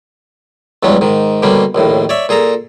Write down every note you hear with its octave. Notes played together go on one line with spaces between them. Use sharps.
E2 G2 F#3 G#3 C#4
G#2 D#3
B2 D3 G3 A#3 C#4
A#1 D#2 A2
C#5 D5 E5
A#2 G#4 A4 A#5